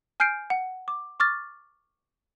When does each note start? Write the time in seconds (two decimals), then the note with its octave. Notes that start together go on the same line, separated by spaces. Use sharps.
0.20 G#5 F6 G6 C7 D7
0.50 F#5
0.88 D6
1.20 C#6 D6 F6 A6